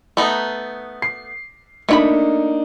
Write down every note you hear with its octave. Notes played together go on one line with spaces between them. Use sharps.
A3 B3 D#4
C7
A3 A#3 D4 D#4 C#5 B5